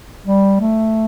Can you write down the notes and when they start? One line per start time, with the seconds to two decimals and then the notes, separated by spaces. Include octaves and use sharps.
0.25 G3
0.61 A3